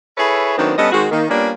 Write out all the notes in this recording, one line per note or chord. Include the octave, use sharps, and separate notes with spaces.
E4 G#4 A4 B4 C#5
D#3 F#3 A3 B3 C4 D4
G3 B3 C#4 A4 D#5
D#3 G#3 C4 F#4
D#3 A#3
G3 A#3 B3 C#4 D4 F4